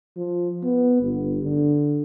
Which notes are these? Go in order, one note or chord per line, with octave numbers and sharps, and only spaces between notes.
F3
B3
G1
D3